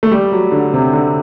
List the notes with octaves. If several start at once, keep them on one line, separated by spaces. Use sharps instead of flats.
A3
G3
F#3
D3
C3
D3